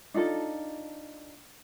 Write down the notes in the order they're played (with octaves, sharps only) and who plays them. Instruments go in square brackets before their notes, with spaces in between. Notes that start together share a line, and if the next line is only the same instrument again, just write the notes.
[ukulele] D4 D#4 F4 A4